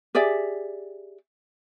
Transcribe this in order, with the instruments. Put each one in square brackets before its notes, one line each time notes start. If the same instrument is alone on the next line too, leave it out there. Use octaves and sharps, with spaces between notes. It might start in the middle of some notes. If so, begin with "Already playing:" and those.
[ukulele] G4 G#4 D5 E5